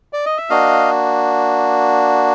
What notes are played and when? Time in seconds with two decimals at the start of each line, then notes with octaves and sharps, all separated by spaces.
0.13 D5
0.26 D#5
0.38 E5
0.49 A#3 D4 F#4 D#5 F5